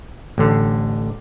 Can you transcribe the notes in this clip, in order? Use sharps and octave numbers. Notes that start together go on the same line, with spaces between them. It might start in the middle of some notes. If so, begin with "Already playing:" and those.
A1 D3